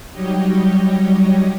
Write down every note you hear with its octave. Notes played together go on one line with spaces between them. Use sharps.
F#3 G3 D#4 G4 C#5 D#5